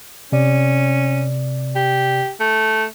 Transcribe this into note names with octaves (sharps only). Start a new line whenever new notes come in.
C3 C#4 D5
G4
A3